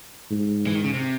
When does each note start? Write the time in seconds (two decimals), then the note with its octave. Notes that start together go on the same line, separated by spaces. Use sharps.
0.31 G#2
0.67 E3
0.75 D#3
0.84 C#3
0.93 C3